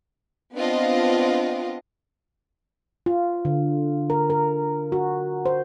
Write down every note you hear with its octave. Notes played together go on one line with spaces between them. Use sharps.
B3 C4 D4 F4 D#5
F4
D3
A#4
A#4
F#4
C5